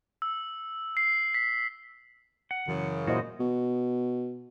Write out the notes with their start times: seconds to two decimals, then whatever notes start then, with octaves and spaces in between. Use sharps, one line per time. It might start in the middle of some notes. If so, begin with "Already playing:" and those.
0.22 E6
0.97 C7
1.34 B6
2.51 F#5
2.68 F#2 C#3 E3
3.07 A#2 E4 F#4 C5 D#5
3.40 B2